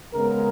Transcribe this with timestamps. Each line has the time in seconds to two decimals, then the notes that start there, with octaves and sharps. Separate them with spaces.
0.13 C#3 G#3 B3 A#4